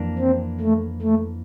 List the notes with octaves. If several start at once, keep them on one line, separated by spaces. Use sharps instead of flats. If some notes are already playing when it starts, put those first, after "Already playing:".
Already playing: F2 E3 A#3 D4
C4
A3
A3